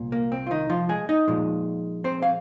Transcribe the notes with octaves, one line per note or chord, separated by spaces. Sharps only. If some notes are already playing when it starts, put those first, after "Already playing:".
Already playing: C2 A#2
A#3
C4
F4
D#3 D#4
F3 F4
G#3 G#4
D#4 D#5
A#2 F3 G#3
C4 C5
F5